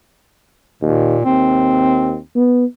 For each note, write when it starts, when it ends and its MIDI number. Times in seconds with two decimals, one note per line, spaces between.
0.82 1.17 39
0.82 1.23 46
1.25 2.16 39
1.25 2.20 60
2.36 2.65 59